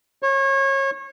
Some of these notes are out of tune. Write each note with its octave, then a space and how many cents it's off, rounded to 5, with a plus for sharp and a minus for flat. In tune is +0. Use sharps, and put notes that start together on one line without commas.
C#5 -30